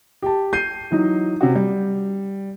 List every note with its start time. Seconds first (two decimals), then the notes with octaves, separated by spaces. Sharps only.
0.22 G4 A5
0.53 G6 C7 D#7
0.91 E3 F#3 D#4
1.41 C3 C#4 F#4
1.55 G3